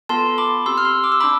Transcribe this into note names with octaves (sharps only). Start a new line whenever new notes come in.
B3 F4 A4 A5 C6
B5 D6
C4 G4 C6 E6
F6
C6 E6
D6
E6
D4 B5 D6